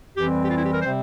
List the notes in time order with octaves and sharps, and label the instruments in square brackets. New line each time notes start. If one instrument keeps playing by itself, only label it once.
[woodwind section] F2 E3 G3 C4 G4
G4
F4
E4
G4
A#4
C3 G3 C4 C5